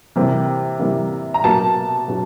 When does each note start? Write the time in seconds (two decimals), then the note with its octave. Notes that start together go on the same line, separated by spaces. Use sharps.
0.16 C3 E3 G3 A#3
0.79 C3 E3 G3 A#3
1.34 A#5
1.44 B2 F#3 A#3 A5
2.08 B2 F#3